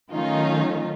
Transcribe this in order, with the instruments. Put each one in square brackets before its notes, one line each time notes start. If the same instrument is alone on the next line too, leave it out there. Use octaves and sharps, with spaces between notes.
[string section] D#3 F#3 A3 C#4 D#4 F4